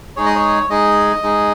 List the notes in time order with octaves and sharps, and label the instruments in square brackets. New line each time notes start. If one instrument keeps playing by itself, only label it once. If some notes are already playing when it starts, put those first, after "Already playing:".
[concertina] G#3 D#4 G#4 C#5
D#5
C#5
G#3 D#4 G#4 D#5
G#3 D#4 G#4